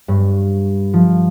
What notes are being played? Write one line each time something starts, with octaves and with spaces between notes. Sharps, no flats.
G2
F3